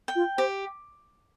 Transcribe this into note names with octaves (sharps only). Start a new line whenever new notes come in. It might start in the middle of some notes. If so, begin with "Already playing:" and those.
G5
F4
G4 C5